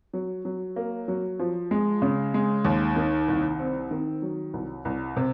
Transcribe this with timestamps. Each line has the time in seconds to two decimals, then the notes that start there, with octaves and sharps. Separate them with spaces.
0.13 F#3
0.45 F#3
0.76 A#3
1.08 F#3
1.39 F3
1.71 G#3
2.02 C#3
2.34 G#3
2.65 D#2
2.96 D#3
3.28 C2
3.59 C4
3.91 D#3
4.22 F#3
4.53 C2
4.85 C2
5.16 C3